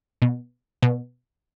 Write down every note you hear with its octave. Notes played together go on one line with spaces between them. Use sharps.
B2
B2